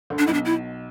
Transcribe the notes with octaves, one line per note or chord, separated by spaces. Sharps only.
D2 D3
D4
B1 B2 E4
D4
E4